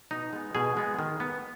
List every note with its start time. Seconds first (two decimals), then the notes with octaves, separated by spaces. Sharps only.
0.11 B2 D#4
0.33 G#3 B3
0.55 B2 G#4
0.77 G#3 B3
0.99 D#3
1.20 B3